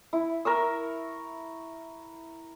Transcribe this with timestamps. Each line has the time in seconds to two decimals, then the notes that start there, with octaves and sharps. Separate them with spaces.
0.13 E4
0.45 A#4 C#6 E6